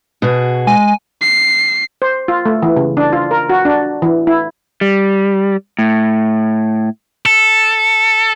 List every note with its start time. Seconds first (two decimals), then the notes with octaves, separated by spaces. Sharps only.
0.22 B2 F#4 G#4
0.67 G#3 G#5
1.22 C7
2.02 C5
2.28 F4
2.46 A3
2.63 E3
2.77 C#3
2.97 D4
3.13 F4
3.31 A#4
3.49 F#4
3.65 D4
4.02 E3
4.27 E4
4.81 G3
5.79 A2
7.26 A4